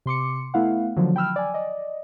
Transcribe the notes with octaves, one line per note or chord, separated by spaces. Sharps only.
C3 C6 D6 C#7
A3 B3 E4 F5 F#5
D3 D#3 F3 F#3
G5 B5 E6 F6
D5 G#5
D5 D#5